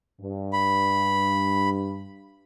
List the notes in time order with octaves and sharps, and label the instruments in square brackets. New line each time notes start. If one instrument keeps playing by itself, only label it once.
[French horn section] G2
[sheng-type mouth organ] B5